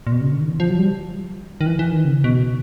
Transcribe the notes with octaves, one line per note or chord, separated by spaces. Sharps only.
A#2
B2
C#3
D3
D#3
E3
F3
F#3
G3
D#3
E3
E3
D#3
C#3
B2